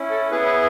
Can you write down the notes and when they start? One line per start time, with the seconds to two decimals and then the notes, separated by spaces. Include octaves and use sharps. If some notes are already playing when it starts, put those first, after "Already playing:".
Already playing: C#4 E4
0.10 A4
0.31 B3 E4 G#4 B4
0.46 B4